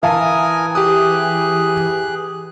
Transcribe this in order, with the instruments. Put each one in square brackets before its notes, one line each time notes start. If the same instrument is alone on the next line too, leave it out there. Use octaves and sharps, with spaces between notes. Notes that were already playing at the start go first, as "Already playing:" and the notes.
[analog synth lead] E3 [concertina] A#4 G#5 D#6 [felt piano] E5 F5 A5
[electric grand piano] G4 D#6 [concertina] G#4 F#6